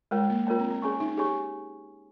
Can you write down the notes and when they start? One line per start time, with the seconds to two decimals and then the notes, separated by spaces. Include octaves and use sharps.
0.11 G#3 F4 A#4 C#5 G5
0.30 A#3
0.47 A#3 F4 A#4 C#5 G5
0.59 C4
0.70 C4
0.82 C#4 G#4 C#5 G#5 C#6
1.00 D#4
1.17 G4 G#4 C#5 G#5 C#6